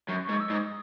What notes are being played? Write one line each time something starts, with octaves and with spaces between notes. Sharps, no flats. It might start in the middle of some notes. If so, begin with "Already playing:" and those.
F#2 C#6
G#2 C#6
E6
G#2
D#6